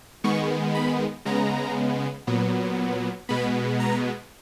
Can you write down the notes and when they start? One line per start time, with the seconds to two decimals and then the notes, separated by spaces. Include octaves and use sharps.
0.24 D#3 G#3 B3 C#6
0.75 B5
1.25 C#3 G#3 B3 A#5
2.27 A#2 F#3 B3
3.29 B2 G#3 B3 B5
3.80 A#5